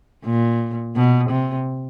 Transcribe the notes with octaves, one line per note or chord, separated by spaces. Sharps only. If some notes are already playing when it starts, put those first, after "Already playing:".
A#2
B2
C3